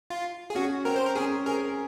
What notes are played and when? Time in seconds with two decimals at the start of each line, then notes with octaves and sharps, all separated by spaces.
0.10 F4
0.50 G#4
0.55 C#4 F#4
0.85 C4 A#4
0.96 C5
1.06 A#4
1.15 C#4 G#4
1.46 G#4 A#4